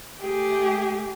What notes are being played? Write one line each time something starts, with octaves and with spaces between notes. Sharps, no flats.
A3 G4 G#4 G5